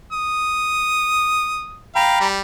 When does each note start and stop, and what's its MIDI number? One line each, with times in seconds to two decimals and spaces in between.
0.12 1.80 87
1.96 2.18 77
1.96 2.27 79
1.96 2.27 82
1.96 2.27 83
2.20 2.41 55